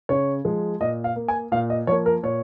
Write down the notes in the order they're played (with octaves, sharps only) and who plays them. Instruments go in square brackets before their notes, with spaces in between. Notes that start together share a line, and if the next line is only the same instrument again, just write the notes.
[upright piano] C#3 C#5
F3 G#3
A#2 D#5
F5
A#3
G#5
A#2 F5
D#5
F3 A#3 C#5
A#4
A#2 C#5